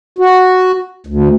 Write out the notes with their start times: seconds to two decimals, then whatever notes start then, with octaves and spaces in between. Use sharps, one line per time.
0.18 F#4
1.07 D2